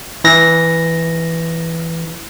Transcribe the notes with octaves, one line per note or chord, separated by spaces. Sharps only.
E3 A#6